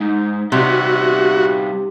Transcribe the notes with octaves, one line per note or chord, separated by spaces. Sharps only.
G#2 D#4
C3 G3 D#4 F#4 E5